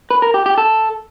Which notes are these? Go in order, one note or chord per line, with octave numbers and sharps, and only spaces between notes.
B4
A#4
G4
G4
A4